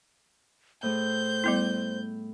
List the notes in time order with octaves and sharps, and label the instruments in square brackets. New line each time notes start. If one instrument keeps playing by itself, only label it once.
[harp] A2 A3 G#4 [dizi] C5 [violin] G6
[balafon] G3 B3 E4